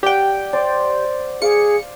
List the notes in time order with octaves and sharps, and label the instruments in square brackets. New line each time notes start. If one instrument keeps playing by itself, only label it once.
[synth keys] G4 G5 [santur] D5 F#5
[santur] C5 D5
[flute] G#4 [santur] F5 D6 [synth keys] C#7